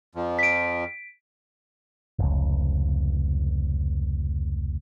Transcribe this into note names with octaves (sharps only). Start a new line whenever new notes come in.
F2 F3
B6 D7
F1 C#2